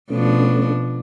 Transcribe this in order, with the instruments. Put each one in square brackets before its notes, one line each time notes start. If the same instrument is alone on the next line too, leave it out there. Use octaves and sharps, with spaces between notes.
[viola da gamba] B2 F3 D4 [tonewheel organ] A3 C#4